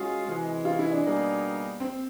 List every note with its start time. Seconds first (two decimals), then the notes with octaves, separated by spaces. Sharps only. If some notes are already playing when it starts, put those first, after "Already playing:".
Already playing: G#3 C#4 F4 F#4 G#4
0.27 C3 E3 G#3
0.65 F4
0.79 E4
0.92 D4
1.04 B2 G3 A#3 D#4 G#4
1.80 C4